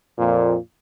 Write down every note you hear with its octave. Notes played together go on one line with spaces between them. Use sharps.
F2 A#2